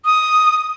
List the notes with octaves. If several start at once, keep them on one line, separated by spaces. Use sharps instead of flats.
D#6